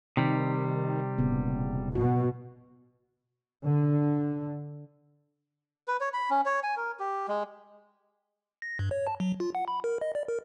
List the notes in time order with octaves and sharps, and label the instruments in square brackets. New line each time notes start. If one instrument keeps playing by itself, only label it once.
[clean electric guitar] C3 G3 [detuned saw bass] D#3 [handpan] D#4
[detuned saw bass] E1 [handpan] A#2 C#3 B3
[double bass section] B2 [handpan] F#4
[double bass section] D3
[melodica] B4
C#5
B5
C#4
C#5
G#5
A#4
G4
G#3
[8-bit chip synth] A#6
G2
C#5
A5
F#3
F4
F#5
B5
A#4
D#5
D5
A#4